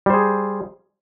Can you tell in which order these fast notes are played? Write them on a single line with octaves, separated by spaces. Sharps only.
G3 C5 G#4